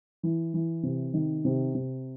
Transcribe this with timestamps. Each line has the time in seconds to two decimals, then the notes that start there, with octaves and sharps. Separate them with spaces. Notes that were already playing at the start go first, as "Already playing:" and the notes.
0.23 E3
0.54 E3
0.83 C3
1.14 D#3
1.45 C3
1.75 C3